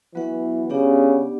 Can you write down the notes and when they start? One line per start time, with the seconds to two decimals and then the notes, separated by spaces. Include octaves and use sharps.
0.15 E3 F#3 B3 F#4 B4 F#5
0.70 C#3 B3 D4 G4 D5 F#5